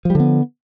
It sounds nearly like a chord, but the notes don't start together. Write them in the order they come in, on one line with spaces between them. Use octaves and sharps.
F3 G3 D3 B3